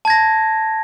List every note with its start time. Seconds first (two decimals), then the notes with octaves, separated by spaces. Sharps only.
0.05 A5
0.07 G#6
0.10 A#6